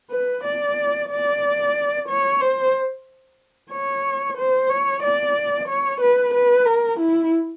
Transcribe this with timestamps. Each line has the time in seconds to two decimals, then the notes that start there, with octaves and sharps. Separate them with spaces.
0.11 B4
0.44 D5
1.10 D5
2.08 C#5
2.41 C5
3.72 C#5
4.37 C5
4.70 C#5
5.03 D5
5.68 C#5
6.01 B4
6.34 B4
6.66 A#4
7.00 E4